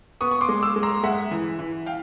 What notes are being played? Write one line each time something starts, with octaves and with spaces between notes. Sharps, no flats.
B3 C#6 D#6
C#6
C6 D6
G#3
D6 E6
G#3
A#5 C6
G#3 E5 F#5
E3
E3
F5 G5